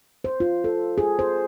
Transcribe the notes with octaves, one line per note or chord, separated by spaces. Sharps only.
C5
F4
A4
G#4
C5